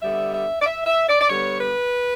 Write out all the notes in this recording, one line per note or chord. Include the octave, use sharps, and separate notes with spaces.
D3 G3 B3 E5
E5
D5
E5
E5
D5
D5
D3 G3 B3 C#5
B4